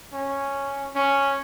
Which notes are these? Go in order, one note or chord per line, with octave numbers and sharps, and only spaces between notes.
C#4
C#4